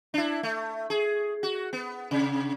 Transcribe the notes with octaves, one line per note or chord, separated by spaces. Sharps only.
D4 E4
A3
G#4
F#4
B3
C3